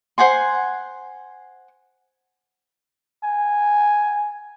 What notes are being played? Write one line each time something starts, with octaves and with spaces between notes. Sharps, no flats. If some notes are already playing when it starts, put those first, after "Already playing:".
C5 F#5 G#5 C6
G#5